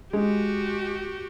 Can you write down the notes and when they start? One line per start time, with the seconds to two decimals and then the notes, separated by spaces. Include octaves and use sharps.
0.13 G#3 F#4 G4